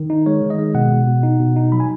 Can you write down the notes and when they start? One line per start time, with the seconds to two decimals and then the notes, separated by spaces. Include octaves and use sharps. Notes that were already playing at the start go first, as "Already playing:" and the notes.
Already playing: D#3
0.10 D#4
0.26 G#3 C#5
0.42 D#3
0.50 D#5
0.59 G#3
0.74 B2 F#5
0.92 B2
1.08 B2
1.23 D#4
1.40 B2
1.56 D#4
1.72 F#3 B5
1.80 G#5